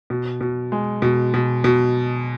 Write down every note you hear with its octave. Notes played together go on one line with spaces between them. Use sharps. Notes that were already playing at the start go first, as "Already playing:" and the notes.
B2
B2
G#3
B2
B2
B2